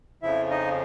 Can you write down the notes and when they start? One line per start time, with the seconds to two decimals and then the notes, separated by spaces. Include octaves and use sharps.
0.22 F2 C#3 F3 E4 E5
0.50 D#4 D#5